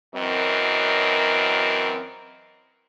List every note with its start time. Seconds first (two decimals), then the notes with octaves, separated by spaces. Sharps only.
0.15 F#2 E3 F#3 C4 A#4 D#5